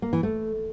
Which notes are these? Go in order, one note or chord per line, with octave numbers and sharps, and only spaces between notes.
A#3
E3
A3